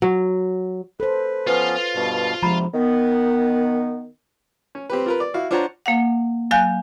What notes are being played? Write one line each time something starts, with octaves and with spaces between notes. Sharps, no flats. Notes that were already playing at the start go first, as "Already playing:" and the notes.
F#3
A4 B4 C5
F3 B3 C#4 F4 B4 F5
G2 B2
E2 C3 F3 G#3 D4 A#5 B5
D#3 B3
C#4
C4 G4 B4
F4 A#4 B4
D5
E4 F#4 F5
D4 F4 C5 C#5 F#5 A#5
A#3 F5 F#5
F#3 F5 G#5 F#6 G6